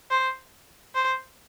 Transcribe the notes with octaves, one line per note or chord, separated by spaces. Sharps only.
C5
C5